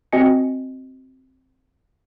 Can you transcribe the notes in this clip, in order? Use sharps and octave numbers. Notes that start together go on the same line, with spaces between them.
C4 F#4 D#5 G#5 C#7